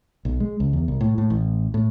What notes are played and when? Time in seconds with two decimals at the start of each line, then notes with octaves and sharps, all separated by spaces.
0.25 B1
0.40 G#3
0.60 C#2
0.73 E2
0.88 C2
1.01 A2
1.18 A2
1.30 A1
1.74 A2